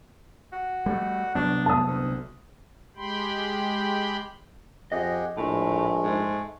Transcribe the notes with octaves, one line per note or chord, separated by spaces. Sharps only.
F#4
G3 A3
C2 F#3 B3 D4
A5 D#6
D2
G#3 G4 G5 B5 C6
F2 G4 G#4 D#5 F#5
A#1 A2 G#3 A3
G#2